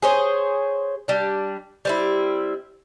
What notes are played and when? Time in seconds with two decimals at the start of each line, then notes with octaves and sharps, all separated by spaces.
0.02 G#4 C5 C#5
1.08 G3 D4
1.85 G3 C4 E4